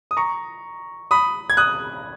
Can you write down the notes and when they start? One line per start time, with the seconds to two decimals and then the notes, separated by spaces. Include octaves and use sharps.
0.11 D#6
0.17 A#5 C#6
1.11 B5 D#6
1.50 G#6
1.57 D#6 F#6